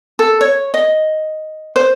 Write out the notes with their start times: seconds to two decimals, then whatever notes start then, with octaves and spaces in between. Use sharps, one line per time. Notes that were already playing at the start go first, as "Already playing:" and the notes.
0.19 A4
0.41 C#5
0.74 D#5
1.76 C5